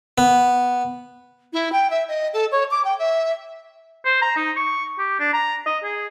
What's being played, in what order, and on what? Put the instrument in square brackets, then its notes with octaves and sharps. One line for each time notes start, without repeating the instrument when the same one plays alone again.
[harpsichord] B3
[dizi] E4
G5
E5
D#5
A4
C#5
D6
G5
E5
[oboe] C5
A#5
D#4
C#6
G4
D4
A#5
D#5
G#4